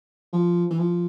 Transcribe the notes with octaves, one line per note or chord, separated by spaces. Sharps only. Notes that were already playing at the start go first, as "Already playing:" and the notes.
F3
E3
F3